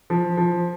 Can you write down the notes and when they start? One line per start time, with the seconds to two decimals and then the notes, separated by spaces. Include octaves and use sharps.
0.10 F3
0.37 F3